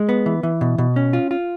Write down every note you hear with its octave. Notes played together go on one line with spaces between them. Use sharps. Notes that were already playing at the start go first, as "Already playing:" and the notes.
Already playing: G#3
B3
E3
E3
B2
B2
C#4
F4
F4